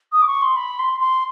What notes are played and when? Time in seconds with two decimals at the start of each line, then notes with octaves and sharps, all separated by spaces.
0.12 D#6
0.22 D6
0.27 C#6
0.42 C6
0.56 B5
0.79 C6
1.00 C6